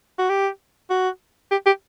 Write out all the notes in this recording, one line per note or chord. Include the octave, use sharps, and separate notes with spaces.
F#4
G4
F#4
G4
G4